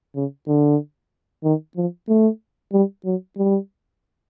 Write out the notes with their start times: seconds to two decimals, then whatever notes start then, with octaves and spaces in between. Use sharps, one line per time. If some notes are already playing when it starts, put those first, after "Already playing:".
0.15 C#3
0.47 D3
1.44 D#3
1.77 F3
2.08 A3
2.73 G3
3.05 F#3
3.37 G3